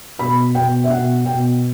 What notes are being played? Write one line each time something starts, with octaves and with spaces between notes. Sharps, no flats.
B2 B5
B2 G5
E5
B2 F#5
B2 G5